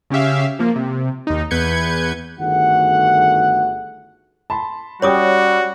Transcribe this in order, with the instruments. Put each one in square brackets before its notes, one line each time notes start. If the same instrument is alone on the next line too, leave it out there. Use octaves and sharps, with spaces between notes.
[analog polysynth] C#3 C#4 G4 E5 F5
F3 A#3
C3
D#2 D#4
E2 B4 G6 G#6 C#7
[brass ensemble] G1 D#3 A3 F#4 G#4 F#5
[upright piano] A5 B5 C6
[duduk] G3 [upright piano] C#4 G4 G5 [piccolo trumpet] F#4 [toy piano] C#5 D6 D#6